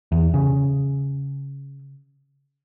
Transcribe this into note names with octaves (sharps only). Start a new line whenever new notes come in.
E2
C#3